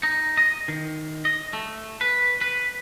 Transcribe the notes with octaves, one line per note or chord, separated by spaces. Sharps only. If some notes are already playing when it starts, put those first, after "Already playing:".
D#4
D#5
D#3
D#5
A3
B4
B4